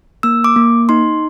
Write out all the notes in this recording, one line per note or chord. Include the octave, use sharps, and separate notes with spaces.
A#3 E6
D6
A#3
D#4 C6